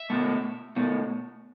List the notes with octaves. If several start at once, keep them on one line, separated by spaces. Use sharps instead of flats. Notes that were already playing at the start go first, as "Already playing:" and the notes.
Already playing: E5
B2 A3
B2 A3